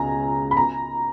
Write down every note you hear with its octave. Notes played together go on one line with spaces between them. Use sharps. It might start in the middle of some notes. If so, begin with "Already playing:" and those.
Already playing: C#2 C#3 G#5 A#5
B5
A#5